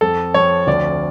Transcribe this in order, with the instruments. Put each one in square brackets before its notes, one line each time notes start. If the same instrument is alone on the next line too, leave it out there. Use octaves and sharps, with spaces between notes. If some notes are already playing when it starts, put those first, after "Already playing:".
[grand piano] F2 A4
F2 C#5
D2 D5